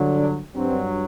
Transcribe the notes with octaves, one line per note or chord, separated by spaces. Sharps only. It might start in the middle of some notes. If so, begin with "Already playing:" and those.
Already playing: G2 D3 F#3
D4
G2 F#3 C4